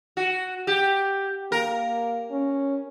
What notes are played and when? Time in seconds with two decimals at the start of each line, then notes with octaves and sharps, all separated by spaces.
0.17 F#4
0.67 G4
1.52 A#3 A#4
2.31 C#4